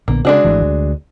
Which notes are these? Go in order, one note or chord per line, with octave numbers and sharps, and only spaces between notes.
A#1 D3 A#3 B3
C#3 G#3 D4 F#4
G#1 E3 A3
D2